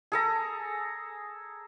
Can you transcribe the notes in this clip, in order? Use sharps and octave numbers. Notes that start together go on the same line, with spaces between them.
G#4 A4 A#5